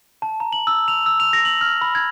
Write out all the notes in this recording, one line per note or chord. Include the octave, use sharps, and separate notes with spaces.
A5
A#5
F#7
E6
F7
E6
F7
A#6
F#7
F6
B5
G#6